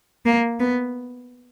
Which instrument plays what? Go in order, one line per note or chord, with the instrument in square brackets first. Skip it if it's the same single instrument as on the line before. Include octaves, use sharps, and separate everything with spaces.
[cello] A#3
B3